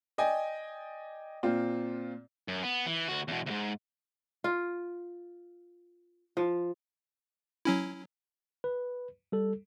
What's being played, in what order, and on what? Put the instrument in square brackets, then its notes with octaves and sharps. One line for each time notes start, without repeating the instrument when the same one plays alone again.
[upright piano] D5 D#5 G5 G#5
A#2 C4 F4
[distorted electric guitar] F#2
B3
E3
D2 F#4
E2 B2
D2 G#2
[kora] F4
F3
[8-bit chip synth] F#3 C#4 E4
[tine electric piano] B4
G3 A4